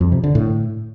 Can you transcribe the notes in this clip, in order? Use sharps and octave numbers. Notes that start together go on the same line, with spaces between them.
F2
C3
D3
A2